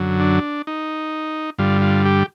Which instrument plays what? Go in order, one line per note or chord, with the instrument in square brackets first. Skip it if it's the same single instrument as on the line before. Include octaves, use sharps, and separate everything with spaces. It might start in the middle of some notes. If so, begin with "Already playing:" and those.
Already playing: [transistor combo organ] F#2 D3 F#3
D4
D#4
G2 D3 G3 F4
F4
G4